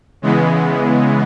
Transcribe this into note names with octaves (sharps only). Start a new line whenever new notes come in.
C#3 E3 G#3 B3